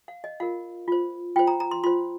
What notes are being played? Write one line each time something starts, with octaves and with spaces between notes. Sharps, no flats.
F5
D#5
F4 A#4 F5
F4 C5
F4 C5 G5
A#5
A#5
C6
F4 C5 C6